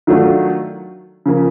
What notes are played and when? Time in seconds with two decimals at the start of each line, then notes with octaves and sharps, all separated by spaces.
0.07 D#3 F#3 A3 D4 F4
1.26 C#3 F3 A#3